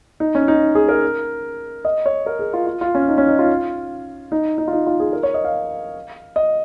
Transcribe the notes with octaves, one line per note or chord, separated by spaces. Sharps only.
D#4
C#4
D#4
G#4
A#4
D#5
C#5
A#4
G#4
F4
F4
F4
C#4
D#4
C#4
D#4
F4
D#4
D#4
F4
D#4
F4
G#4
A#4
C#5
D#5
F5
D#5